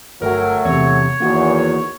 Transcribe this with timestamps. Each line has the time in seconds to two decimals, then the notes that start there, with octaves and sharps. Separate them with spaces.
0.22 G1 F#3 A3 A#4 G5
0.65 E2 C3 C#5
1.20 E2 D#3 A#3 F#4